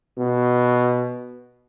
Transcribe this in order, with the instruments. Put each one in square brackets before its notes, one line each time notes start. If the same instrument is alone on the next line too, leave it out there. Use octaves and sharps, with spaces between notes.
[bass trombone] B2